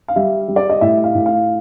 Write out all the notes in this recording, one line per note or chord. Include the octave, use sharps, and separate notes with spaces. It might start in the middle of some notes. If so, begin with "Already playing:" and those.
F5
G3 E5
G3
D5
D#5
A2 E5
F5
A2
F5